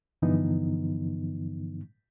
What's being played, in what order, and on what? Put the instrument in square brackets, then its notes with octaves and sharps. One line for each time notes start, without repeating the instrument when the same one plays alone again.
[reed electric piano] G2 D3 E3 F3 B3 D#4